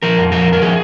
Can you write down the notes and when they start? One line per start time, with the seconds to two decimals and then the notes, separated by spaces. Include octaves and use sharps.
0.02 F3 A#4
0.18 F2
0.32 F3 A#4
0.48 F2 A#4
0.62 F3 G#4